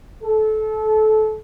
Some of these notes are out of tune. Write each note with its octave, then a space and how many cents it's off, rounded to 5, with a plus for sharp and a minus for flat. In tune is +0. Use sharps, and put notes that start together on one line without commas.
A4 -25